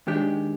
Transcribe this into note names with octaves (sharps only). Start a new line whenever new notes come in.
D#2 D#3 G#3 D4 G4